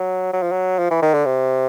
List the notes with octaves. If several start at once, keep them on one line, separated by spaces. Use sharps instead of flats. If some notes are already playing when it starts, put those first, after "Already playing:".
Already playing: F#3
F#3
F3
F#3
F3
E3
D#3
D3
C3